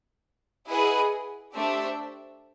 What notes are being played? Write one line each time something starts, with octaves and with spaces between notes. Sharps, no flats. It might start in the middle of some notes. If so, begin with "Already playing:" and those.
E4 G#4 B4 D#5 F#5
A3 D4 G4 C5 E5